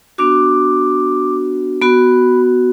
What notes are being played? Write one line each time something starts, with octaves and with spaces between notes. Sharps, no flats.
B3 D4 F#4 D6
B3 F#4 B5